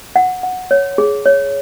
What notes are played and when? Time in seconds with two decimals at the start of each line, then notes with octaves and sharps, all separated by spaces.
0.16 F#5
0.43 F#5
0.71 C#5
0.98 G#4
1.26 C#5